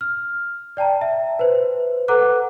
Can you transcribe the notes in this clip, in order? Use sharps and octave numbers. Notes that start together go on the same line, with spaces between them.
F6
D5 G5 A5 A#5
E5
B4 C5
A4 B4 F#5 A#5 D6 F#6